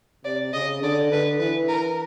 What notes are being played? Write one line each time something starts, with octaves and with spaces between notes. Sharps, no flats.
C3 D5
C#3 D#5
D3 D5
D3 B4
E3 B4
A#4